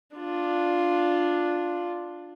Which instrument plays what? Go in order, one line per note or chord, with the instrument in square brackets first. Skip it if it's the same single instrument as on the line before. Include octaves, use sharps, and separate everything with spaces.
[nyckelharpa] D4 F4